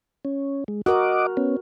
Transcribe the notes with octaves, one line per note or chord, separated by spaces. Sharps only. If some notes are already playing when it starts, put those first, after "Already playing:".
C#4
G#3
F#4 A#4 D#5 F#5 D6
B3 C#4